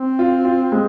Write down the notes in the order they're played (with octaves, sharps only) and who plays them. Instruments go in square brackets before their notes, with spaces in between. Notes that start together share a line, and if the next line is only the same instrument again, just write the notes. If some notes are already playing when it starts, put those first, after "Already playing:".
Already playing: [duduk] C4
[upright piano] F4
F4
G#3